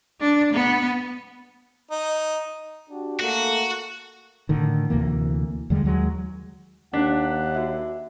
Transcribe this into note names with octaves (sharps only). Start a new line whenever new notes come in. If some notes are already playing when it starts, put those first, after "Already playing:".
D4
B3
D#4
D4 F#4 G4
A3 A#3 F#4 A4
A2 D3 D#3
D2 C3 E3 A#3
E2 D3 G3 G#3
D#2 F#3 G#3
D#2 D4 F#5 B6
F#4 E5